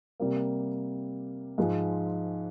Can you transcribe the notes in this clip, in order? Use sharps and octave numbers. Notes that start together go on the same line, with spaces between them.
C3 G3 A#3
G#2 F3 G#3